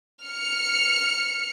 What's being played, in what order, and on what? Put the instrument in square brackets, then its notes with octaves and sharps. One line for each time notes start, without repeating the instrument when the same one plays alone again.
[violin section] F6 C#7